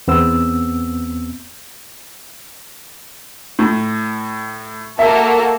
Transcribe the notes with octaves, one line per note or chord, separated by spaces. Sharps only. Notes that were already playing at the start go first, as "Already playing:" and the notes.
E2 B3 C4 E6
A2
A#3 F#4 A4 E5